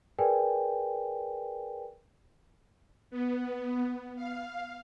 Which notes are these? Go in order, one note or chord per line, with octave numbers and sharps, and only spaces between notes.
G#4 A#4 B4 D5 G5 G#5
B3
F5